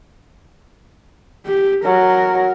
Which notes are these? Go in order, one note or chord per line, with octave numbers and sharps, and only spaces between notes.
G4
F#3 A#4